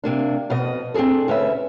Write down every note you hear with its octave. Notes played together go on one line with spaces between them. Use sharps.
C3 A#3 D4
F2 B2 B3 D#5
C4 D4 F4 G#4 A4
D2 C#4 B4 E5